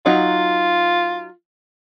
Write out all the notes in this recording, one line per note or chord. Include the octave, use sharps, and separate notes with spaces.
F#3 D#4 F4 F#4